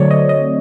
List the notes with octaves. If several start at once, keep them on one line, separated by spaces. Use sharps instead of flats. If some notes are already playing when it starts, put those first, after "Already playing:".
Already playing: D3 F#3 A3 C4 C#5 D5
D#5
D#5